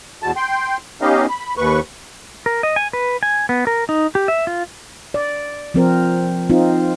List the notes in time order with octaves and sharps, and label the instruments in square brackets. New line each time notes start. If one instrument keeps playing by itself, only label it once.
[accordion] E2 B2 A5
G5 C6
B3 C#4 D#4 G4 D#5 F5
B5
D#2 B4 C#6
[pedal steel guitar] A#4
D#5
G#5
B4
G#5
B3
A#4
D#4
G4
E5
F4
[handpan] D5
F3 C4 A#4
C4 D#4 F4